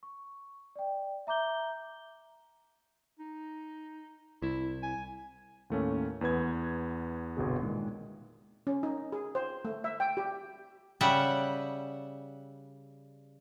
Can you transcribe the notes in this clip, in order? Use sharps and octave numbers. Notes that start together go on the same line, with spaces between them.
C#6
D5 G5
E5 A#5 D6 G6 G7
D#4
C2 E4
G#5
D#2 A2 A3 A#3 C#4
E2 B3 B4 G#6
G1 C2 B2 G#4
A#2 D#3 G#3
C#4
D#4
G#4
C5
A3
E5
G5
G4
C#3 G3 E5 F#5